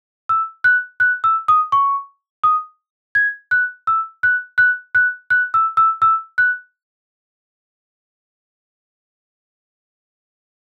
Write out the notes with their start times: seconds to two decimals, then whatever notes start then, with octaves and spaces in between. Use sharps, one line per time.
0.29 E6
0.64 F#6
1.00 F#6
1.24 E6
1.48 D#6
1.72 C#6
2.44 D#6
3.15 G#6
3.51 F#6
3.87 E6
4.23 F#6
4.58 F#6
4.95 F#6
5.30 F#6
5.54 E6
5.77 E6
6.02 E6
6.38 F#6